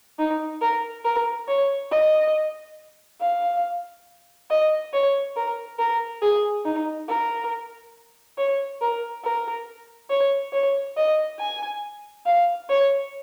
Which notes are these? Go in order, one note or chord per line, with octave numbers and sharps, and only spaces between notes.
D#4
A#4
A#4
C#5
D#5
F5
D#5
C#5
A#4
A#4
G#4
D#4
A#4
C#5
A#4
A#4
C#5
C#5
D#5
G#5
F5
C#5